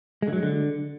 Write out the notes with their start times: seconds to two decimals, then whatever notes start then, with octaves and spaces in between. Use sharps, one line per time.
0.22 G#3
0.28 D3
0.33 F#3
0.38 G#3
0.43 D3